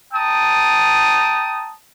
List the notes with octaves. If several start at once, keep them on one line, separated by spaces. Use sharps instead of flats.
G5 A5 A#5 D#6